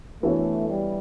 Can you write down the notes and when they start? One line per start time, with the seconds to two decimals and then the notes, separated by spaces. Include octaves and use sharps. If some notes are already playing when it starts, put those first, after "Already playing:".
0.23 E3 A3 B3 D4 F#4 C#5
0.68 G3